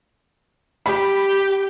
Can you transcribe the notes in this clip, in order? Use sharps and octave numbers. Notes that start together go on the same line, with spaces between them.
G4 B5